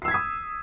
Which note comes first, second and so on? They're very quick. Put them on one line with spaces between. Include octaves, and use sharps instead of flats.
C7 E6 G#6 B6 D#6